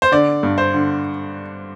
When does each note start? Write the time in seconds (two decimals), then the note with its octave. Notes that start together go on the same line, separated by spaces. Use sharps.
0.02 C5
0.12 D3 D5
0.43 G2
0.58 C5
0.74 D3